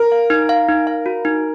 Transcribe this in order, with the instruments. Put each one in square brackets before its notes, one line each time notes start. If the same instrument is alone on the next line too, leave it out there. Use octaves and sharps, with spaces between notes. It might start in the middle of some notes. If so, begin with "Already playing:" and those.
Already playing: [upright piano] A#4
[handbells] F5
D#4
F5
D#4
F5
F#4
D#4